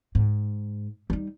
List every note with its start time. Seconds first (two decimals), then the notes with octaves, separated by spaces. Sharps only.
0.15 G#2
1.10 G3 D#4